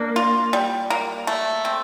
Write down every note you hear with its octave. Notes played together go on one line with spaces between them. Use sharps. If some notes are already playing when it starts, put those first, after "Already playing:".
Already playing: A#3 D4
F4
G3
A#3
A3
C4